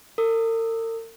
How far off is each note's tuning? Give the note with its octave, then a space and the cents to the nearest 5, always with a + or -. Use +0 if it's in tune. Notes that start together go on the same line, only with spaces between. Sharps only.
A#4 -45 D#6 -20